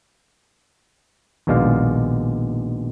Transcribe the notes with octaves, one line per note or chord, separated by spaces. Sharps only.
A#1 D#2 B2 G#3 D5 F5